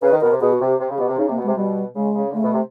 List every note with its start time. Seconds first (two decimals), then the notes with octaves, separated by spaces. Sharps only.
0.02 C#3 B4
0.12 D#3
0.21 B2 A#4
0.31 C3
0.41 B2 G#4
0.53 F#4
0.60 C3
0.66 G4
0.80 C3
0.90 C#3
0.94 G#4
0.99 B2 G4
1.08 C3
1.18 C#3 D#4
1.28 C3
1.30 A#3
1.38 B2
1.44 C3 G#3
1.56 B2 G3
1.96 C#3 G#3
2.15 C#3
2.30 D3
2.34 C#3 A3
2.44 B2
2.53 C3